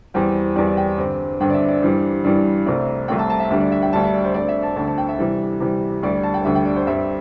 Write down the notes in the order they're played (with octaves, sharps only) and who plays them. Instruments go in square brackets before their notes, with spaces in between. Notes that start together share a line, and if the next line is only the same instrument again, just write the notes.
[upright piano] E2 E3 G3 C4 G5
E2 E3 G3 C4 D5
D5
G5
G2 D3 C4
G2 D3 C4 G5
D5
E5
D5
G2 E3 G3 C5
G2 E3 G3 D5
C2 C3 A3 C4 D5
C2 C3 A3 C4 G5
A5
A5
E5
D2 D3 G3 D4 E5
D5
E5
G5
D2 D3 G3 D4 A5
E5
D5
C5
D2 D3 C4 D5
E5
A5
D2 D3 C4 A5
A5
G5
E5
C3 E3 G3
C3 E3 G3
D2 D3 G3 D5
A5
G5
D2 D3 G3 E5
G5
D5
C5
G2 G3 C4 E5